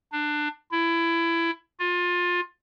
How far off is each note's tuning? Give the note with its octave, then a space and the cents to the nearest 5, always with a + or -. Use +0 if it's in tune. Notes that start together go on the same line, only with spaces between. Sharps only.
D4 +20
E4 +20
F4 +25